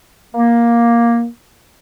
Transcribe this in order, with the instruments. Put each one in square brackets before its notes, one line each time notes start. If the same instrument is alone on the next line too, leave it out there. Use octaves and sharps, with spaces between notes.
[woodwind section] A#3